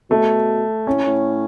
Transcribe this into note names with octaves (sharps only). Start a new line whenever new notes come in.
B2 A3
A2 C#4
A2